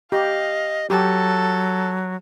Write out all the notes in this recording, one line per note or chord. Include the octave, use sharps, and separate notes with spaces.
G4 D#5 F5
F#3 G4 A4